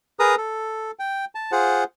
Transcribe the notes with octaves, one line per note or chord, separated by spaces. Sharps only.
G#4 A#4 B4 A#5 D#6
A4
G5
A5
F4 G#4 C5 F#5